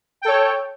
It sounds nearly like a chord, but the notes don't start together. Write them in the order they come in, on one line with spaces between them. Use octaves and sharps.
G5 A4 C#5